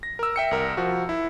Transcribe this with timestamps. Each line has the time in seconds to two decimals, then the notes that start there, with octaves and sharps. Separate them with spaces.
0.03 A#6
0.19 A#4 E6
0.36 E5 G5 C#7
0.51 C2 A#4
0.77 F3 F#4
1.09 E4